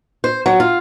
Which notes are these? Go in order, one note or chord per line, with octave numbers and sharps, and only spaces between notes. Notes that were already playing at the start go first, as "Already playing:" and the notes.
C5
F#3
F4